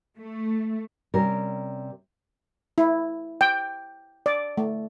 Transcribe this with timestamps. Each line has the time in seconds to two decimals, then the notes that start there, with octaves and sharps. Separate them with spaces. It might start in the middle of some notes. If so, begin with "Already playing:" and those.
0.18 A3
1.14 C3 G3 C#4 A#4
2.78 E4
3.41 G5
4.26 D5
4.57 A3